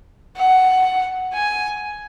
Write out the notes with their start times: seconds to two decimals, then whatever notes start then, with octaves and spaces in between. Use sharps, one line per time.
0.38 F#5
1.34 G#5